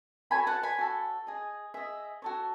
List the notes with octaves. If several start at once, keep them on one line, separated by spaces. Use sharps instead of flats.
F#4 A4 C#5 G#5 B5
F#5 A5
G#5 B5
F#4 A4 C#5
G#4 D#5
G#4 D#5 E5
F#4 A4 C#5